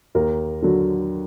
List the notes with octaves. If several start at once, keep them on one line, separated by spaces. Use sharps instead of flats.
D#2 A#4
D3 F#3